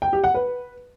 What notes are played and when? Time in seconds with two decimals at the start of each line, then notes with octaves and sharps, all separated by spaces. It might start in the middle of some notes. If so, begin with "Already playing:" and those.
0.02 G5
0.13 G4
0.24 F#5
0.34 B4